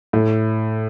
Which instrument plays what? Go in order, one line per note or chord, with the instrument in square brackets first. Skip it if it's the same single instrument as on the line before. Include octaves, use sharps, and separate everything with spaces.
[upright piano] A2